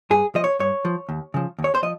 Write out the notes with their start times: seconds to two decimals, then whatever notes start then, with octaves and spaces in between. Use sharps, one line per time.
0.10 G2 G#4
0.35 F3 D#5
0.44 C#5
0.59 G2 C#5
0.85 F3
1.09 D#2
1.34 C#3 F3
1.59 D#2
1.64 C#5
1.75 C5
1.83 F3 D#5